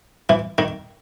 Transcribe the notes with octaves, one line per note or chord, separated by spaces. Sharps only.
E3
D#3